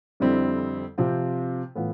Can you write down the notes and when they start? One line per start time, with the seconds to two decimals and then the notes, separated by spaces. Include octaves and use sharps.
0.20 F2 D3 G3 C4 E4
0.98 C3 F3 C4 F4
1.76 A2 E3 B3 F4